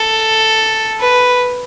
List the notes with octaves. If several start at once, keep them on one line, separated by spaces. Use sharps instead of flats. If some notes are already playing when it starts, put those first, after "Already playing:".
Already playing: A4
B4